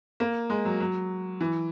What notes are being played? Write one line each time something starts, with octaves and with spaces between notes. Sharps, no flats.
A#3
G#3
F#3
F#3
E3